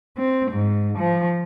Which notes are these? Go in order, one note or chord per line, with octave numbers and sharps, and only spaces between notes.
C4
G#2
F3